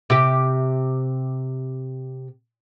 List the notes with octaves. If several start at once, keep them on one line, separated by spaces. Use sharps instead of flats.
C3 G4